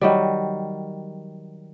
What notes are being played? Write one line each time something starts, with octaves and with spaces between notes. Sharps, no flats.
D#3 F#3 G3